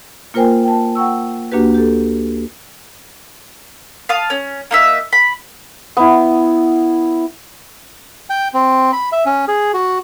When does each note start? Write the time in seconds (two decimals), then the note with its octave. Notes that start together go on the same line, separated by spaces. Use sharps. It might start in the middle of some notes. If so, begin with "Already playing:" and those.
0.34 A#3 F4 A#4 C5 G5 G#5
0.64 G5 A5
0.95 F#5 G5 C#6 E6
1.52 D2 A#3 D4 F#4 G4 B4
1.74 G4 A4
4.09 F5 A5 D#6
4.30 C#4
4.71 A#3 D#4 E5
5.13 B5
5.97 B3 E4
8.30 G5
8.54 C4
8.93 B5
9.12 E5
9.26 C#4
9.48 G#4
9.74 F#4